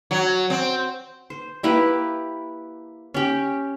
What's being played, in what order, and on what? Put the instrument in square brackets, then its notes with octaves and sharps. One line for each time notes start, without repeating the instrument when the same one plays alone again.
[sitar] F#3
C4
[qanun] C5
A#3 E4 G4 B4
C#4 G4